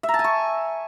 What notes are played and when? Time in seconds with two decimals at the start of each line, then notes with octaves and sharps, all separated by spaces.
0.03 E5
0.09 A#5
0.14 A5
0.19 G#5
0.24 C#6